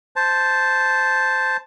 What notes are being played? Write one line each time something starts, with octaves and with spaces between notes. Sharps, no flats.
C5 A5